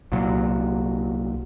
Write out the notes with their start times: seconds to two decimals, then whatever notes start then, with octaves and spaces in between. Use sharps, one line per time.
0.12 C2 A#2 F#3